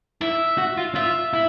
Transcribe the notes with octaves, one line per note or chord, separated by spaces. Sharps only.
E4 E5
F#4
F4
F4 E5
E4